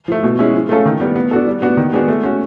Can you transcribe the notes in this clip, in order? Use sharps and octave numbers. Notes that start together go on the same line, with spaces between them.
F3 A3
B2
G#3 C#4 E4
F3
A3 C#4 F4 A4
D#3
G3 B3
B3
D4 F#4 A4
G3
B3 D4 F#4
D#3
G#3 B3 D4 F#4
A3
C#4 F#4